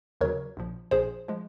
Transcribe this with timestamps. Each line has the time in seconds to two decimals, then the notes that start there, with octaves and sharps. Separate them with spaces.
0.21 D#2 C#3 F#3 A#4 C#5
0.57 A#1 A#2 F3
0.91 A#1 A#2 F3 G#4 C5
1.28 F3 G#3